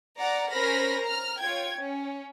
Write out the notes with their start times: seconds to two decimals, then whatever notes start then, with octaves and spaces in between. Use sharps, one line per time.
0.20 D5 F#5 A#5
0.51 C#4 A#4 C5 B5 F6 A#6
1.02 A#5 F6
1.40 F4 C#5 G5 G#6
1.80 C#4